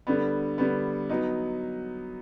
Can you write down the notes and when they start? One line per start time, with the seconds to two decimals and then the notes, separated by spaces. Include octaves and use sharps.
0.07 D3 G3 B3
0.58 D3 G3 B3
1.09 F#3 B3 D#4